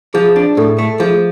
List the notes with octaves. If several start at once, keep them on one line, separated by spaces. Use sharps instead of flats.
F3 G#4
D4
A2 A4
A3
F3 G#4